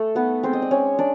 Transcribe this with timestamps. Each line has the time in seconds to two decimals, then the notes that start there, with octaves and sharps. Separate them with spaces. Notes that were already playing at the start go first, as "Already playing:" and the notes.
Already playing: A3 A4
0.15 B3 D#4 B4
0.43 G#3 C4 C5
0.53 D#5
0.62 D5
0.71 G#3 C#4 C#5
0.99 D4 D5